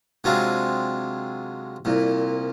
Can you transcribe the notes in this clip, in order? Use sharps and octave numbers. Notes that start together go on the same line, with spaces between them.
C3 F#3 G#3 C4 D4 F4
C2 A#2